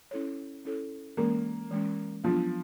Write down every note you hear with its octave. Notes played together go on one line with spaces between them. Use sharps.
C#4 E4 A4 C#5
C#4 E4 A4 C#5
E3 G#3 A#3 C#4
E3 G#3 C#4
F3 F#3 B3 D4 F4